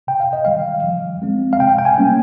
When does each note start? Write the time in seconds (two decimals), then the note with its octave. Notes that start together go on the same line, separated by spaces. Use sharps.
0.07 C3 G5
0.20 F5
0.33 D#5
0.45 D#3 G3 F5
0.84 F3
1.22 G#3 C4
1.53 F5
1.60 C3 G5
1.79 G5
1.85 G#5
1.98 G3 A#3 C#4